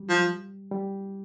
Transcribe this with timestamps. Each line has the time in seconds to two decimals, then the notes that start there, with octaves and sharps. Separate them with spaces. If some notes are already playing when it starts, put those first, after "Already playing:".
Already playing: F#3 G3
0.09 F3
0.71 G3